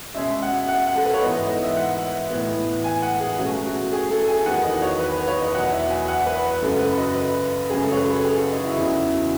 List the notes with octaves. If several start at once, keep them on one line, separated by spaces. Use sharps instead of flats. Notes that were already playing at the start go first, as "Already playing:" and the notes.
B2 G#3 C#4 E5
F#5
F#5
F#5
A4
B4
C#5
G#2 E3 B3 D#5
D#5
D#5
E5
F#5
A2 E3 B3
G#5
F#5
G#4
B2 F#3 A3 C#4 F#4
F#4
G#4
A4
G#5
E2 D#3 F#3 B3 F#5
D#5
C#5
B4
B4
C#5
D#5
E2 B2 F#3 F#5
E5
G#5
F#5
B4
F#2 C#3 F#3 A4
B4
D#5
B4
F#2 C#3 F#3 G#4
A4
C#5
B4
A4
G#4
F#4
D#4
E4
E2 C#3 F#3 C#4